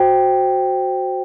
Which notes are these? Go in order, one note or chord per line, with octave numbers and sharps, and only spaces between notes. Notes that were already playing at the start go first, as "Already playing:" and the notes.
Already playing: F#4 C5 G5